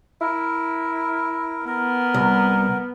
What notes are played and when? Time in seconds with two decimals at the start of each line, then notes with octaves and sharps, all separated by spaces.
0.21 E4 A#4
1.67 B3 A#4
2.14 C2